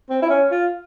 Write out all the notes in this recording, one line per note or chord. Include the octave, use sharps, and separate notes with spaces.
C4
E4
C#4
F4